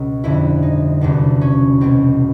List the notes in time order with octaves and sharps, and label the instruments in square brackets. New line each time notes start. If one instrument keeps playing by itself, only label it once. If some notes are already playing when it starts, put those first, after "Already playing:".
Already playing: [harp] C#2 B2
G1 F2 D3 E4
D#4
F#1 E2 C3 D4
C#4
C#2 B2 C4